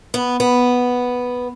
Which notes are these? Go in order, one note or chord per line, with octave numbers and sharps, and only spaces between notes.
B3
B3